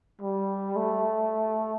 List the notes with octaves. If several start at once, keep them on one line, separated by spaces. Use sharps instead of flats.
G3
A3